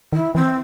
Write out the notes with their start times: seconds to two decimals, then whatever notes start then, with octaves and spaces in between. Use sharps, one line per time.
0.13 D#3 E4
0.35 E3 C4